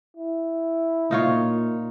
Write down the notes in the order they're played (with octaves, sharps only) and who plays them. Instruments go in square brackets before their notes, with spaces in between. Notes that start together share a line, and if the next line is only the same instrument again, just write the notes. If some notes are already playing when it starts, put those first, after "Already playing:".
[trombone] E4
[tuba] A#2 [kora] D#4 F4 C#5